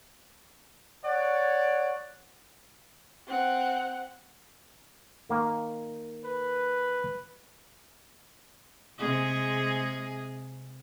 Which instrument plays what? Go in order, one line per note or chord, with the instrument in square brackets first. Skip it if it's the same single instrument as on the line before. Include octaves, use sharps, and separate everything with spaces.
[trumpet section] C#5 D5 F#5
[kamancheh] C4 F#5
[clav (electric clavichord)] D#3 A#3
[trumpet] B4
[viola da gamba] C3 G#3 G#4